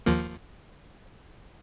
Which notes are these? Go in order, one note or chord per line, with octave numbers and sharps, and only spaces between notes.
D#2 F3 A#3